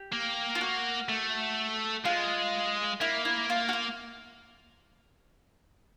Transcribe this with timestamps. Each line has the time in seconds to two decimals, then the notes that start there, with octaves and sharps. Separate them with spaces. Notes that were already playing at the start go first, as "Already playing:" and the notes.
Already playing: G4
0.13 A#3
0.55 F4
0.61 F#4
1.09 A3
2.05 G#3 F4
3.01 A#3 E4
3.25 E4
3.50 F4
3.69 F#4
3.73 F4